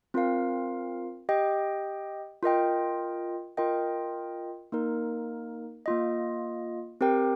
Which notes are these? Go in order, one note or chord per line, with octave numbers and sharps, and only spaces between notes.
C4 F4 A#4 F5
G4 D#5 G5
F4 A#4 D#5 G5
F4 A#4 D#5 G5
A#3 D#4 A#4
A#3 F4 D#5
C4 G4 A#4 G5